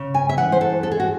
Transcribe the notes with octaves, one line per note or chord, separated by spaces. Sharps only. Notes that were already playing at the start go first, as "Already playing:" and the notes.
Already playing: C#3
G#5
E5
E3 F#5
C5
A4
E2 A4
G#4
F#4